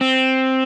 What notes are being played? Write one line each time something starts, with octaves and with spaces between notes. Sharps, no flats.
C4